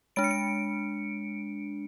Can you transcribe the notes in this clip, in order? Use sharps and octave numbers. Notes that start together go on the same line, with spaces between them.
G#3 D4 D7
C#7
D7